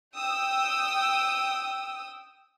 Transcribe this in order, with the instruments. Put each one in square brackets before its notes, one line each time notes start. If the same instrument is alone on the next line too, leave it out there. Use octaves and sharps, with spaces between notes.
[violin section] G5 D#6 E6